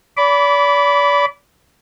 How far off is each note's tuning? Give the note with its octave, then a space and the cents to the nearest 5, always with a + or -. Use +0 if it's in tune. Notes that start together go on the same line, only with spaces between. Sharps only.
D5 -40 B5 +0 D6 -25